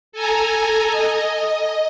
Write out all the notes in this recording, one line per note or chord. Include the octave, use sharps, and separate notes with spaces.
A4 G#5 A#5
D#5